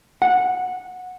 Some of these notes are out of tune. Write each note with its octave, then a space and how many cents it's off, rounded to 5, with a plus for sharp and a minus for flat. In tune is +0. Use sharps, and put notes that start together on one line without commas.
F#5 -15